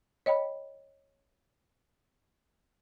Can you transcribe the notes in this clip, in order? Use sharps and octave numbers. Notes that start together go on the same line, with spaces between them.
C#5 D#5 G5 B5